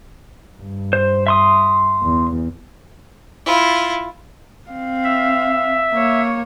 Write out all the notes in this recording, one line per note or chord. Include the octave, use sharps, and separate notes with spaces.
G2
C5
E5 C6 D#6
E2
E4 F4
C4 F5
E5
A#3 C#5